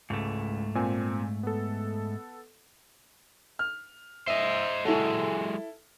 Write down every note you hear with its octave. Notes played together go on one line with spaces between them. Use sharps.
C#2 G#2 A3
A#2 C4 G#5
B3 A4
F6
C5 D#5 E5
F#3 G#3 E4 A4